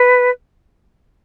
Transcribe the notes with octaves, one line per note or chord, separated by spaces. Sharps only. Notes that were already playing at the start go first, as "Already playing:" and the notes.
Already playing: B4